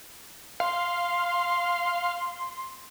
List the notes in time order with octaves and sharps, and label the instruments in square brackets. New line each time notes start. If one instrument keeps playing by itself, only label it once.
[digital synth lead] F5 [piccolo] C6